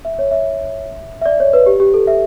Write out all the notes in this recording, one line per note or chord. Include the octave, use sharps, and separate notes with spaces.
E5
C#5
E5
E5
D5
C#5
B4
G4
G4
A4
E5